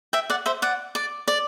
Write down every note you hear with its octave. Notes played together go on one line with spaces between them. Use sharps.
E5 G5
D5 F#5
C5 E5
D5 F#5
D5
D5